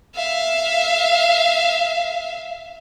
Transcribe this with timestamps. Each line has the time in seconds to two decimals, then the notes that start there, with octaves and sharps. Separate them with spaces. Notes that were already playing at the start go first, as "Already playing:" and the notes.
0.15 E5 F5